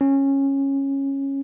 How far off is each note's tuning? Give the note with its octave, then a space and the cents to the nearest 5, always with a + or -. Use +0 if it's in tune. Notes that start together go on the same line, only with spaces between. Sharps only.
C#4 -15